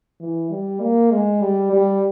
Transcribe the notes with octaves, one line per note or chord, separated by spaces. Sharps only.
E3
G3
A#3
G#3
G3
G3